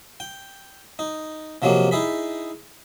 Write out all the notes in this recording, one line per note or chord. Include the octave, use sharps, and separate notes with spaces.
G5
D#4
C3 F3 F#3 G#3 A#3
D#4 E4 G#4 B5